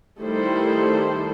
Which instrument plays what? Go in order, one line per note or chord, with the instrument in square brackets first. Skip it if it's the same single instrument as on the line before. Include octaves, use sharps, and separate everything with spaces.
[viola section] D#3 G3 A3 E4 A4 C5